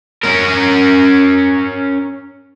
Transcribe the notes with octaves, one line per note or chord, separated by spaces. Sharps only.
C#4 A#4